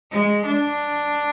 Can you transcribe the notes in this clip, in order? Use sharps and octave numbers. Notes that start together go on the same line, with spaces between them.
G#3
D4